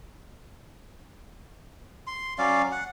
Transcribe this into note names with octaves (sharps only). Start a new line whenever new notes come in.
C6
F#3 C#4 D5 F5
F#5